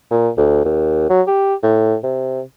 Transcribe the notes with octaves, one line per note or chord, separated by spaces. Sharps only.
A#2
D2
D#2
F#3
G4
A2
C3